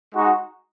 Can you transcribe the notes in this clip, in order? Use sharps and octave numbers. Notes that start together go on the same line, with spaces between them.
G#3 D#4 F#4